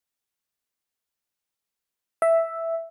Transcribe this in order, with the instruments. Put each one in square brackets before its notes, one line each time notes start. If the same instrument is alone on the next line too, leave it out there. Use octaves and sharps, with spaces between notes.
[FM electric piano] E5